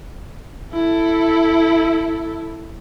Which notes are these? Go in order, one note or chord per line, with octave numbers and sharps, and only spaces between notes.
E4 A4